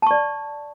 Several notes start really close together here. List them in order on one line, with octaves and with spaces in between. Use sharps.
A5 C#6 D5